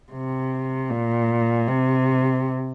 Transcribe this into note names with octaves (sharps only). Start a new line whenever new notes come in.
C3
A#2
C3